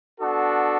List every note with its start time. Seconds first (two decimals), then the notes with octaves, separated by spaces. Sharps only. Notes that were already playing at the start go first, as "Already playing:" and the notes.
0.21 B3 D4 F#4 A4